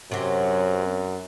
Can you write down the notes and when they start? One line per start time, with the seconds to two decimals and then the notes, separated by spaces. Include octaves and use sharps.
0.11 F#2 C3 F#3